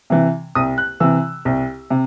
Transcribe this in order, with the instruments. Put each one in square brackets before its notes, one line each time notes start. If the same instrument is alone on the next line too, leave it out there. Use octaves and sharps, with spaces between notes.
[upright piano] C3 E3
C2 D#6
F#6
C3 E3 E6
C2
C3